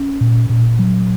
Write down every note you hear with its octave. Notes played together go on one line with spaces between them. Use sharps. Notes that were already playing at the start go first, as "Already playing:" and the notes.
Already playing: C#4
A#2
A#2
F#3